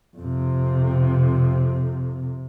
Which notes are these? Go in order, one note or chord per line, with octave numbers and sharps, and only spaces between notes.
F2 C3